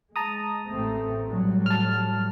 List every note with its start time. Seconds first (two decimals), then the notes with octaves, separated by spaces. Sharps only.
0.16 G#3 A5 A#5 D#6
0.70 A1 A3 C4
1.29 A2 F#3 G3
1.66 A5 F6